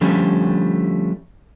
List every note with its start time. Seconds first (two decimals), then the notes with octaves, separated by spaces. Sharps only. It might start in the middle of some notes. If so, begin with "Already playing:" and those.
0.01 D3 F3 G3 A3 C#4